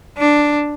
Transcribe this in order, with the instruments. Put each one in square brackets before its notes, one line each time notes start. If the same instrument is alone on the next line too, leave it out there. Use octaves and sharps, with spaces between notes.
[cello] D4